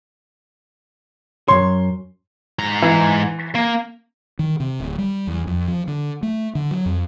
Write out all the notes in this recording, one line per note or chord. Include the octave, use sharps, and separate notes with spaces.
F#2 C#3 C#5 C6
G#2 A#5
E3
A#3
D#3
C3
D1
G3
E2
F2
F3
D3
A3
D3
F#3
F2